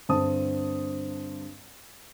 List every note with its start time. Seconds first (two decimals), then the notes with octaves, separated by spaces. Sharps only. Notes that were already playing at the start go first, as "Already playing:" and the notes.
0.09 G2 D3 C4 C5 A5 D#6